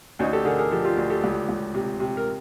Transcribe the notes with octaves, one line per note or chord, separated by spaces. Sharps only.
D2 C#4 D#4
G4 A4
D3 G#4 A#4
G#4 A#4
F3 G4 A4
F4 G4
D2
G4 A4
C#2
C#2
C3
C3
A#4